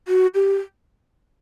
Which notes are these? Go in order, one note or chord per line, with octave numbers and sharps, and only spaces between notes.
F#4
G4